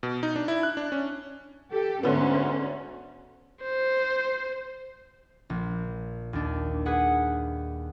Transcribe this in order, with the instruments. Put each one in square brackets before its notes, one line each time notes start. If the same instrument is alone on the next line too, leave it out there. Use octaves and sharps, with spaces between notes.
[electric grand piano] B2
D#4
D4
E4
F#6
D4
C#4
[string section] G4 A4
[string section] D2 C#4 [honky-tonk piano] G#2 D3 B3
[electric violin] C5
[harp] A#1
D#2 D4
G#4 B4 F#5